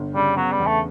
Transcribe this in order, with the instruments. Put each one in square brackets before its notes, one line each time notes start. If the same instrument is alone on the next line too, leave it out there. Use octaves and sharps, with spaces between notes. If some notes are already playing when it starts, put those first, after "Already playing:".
Already playing: [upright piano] G1
[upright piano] C#3 [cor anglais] G3
[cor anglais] F#3 [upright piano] B3
[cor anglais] G3
[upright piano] E2
[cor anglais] A3